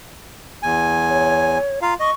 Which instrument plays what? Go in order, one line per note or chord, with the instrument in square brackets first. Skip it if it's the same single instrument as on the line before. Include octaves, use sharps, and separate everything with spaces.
[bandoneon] E2 G#5
[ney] C#5
[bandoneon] F4 F5 [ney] A#5
[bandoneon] D#5 [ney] C#6